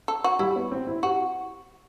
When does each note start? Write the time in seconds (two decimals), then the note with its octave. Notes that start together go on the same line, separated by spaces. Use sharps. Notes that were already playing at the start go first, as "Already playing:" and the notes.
0.08 A4
0.24 F#4
0.39 G3 E4
0.56 B3
0.72 C4
0.87 E4
1.03 F#4 G4